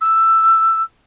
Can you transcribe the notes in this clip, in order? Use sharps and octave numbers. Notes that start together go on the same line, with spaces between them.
E6